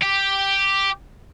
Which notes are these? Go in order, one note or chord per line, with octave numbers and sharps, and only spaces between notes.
G4